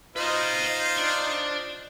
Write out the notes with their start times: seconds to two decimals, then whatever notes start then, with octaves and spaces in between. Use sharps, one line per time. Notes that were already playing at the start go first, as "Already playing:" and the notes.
0.16 D#4 F4 B4 C5 D#5
0.97 D4